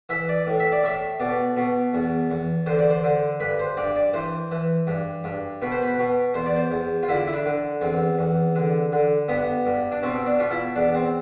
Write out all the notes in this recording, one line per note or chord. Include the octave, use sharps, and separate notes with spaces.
E3 E5
D5
A2
E5
D5
A2 E5
B2 D5
B2
E2
E2
D3 C5
D5
C5
D3
G2 B4
C5
G2 D5
D5
E3 C5
E3
G2
G2
B2 B4
C5
B4
B2
E2 C5
D5
C5
E2
F4
D3 E4
E4
D4
D3
E2 C4
E2
D3
D3
G2 B3
G2
D4
B2 C4
D4
B2 F4
E4
E2 D4
C4